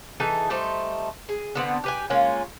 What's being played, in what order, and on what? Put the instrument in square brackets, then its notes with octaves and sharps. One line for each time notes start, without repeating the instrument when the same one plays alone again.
[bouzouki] E3 D#4 G#4 A4
G3 A3 D#4 C5
G#4
D3 B3 C4
G4 B4 G#5
G#3 A#3 C#4 F4